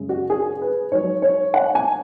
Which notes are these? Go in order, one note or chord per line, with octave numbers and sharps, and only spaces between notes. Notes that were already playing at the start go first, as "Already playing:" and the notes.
Already playing: F#2 C#3 G#3
F#4
G#4
B4
G#2 F#3 C#5
C#5
F#5
G#5